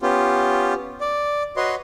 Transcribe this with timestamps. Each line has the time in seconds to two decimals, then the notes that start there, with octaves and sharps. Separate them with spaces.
0.02 B3 C#4 F4 G4
1.01 D5
1.57 F#4 B4 C#5 D#5 C6